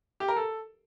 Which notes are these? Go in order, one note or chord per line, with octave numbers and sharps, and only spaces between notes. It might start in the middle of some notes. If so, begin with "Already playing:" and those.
G4
A#4
A4